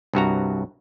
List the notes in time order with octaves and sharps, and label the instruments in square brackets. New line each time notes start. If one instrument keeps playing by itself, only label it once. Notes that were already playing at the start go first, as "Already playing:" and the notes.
[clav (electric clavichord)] C2 G2 F#4 A#5